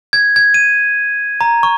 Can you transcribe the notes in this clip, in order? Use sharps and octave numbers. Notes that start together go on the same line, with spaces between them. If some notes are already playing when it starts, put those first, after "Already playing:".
G#6
G#6
D#7
A#5
C#6